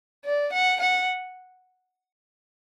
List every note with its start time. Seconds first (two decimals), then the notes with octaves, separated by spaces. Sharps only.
0.25 D5
0.53 F#5
0.80 F#5